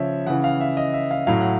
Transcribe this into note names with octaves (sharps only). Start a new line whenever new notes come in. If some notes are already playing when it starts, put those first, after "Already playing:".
Already playing: C#3 F3 C#5 E5
C#3 E3 F#5
F5
E5
D#5
E5
F5
A2 F#3 F5
F#5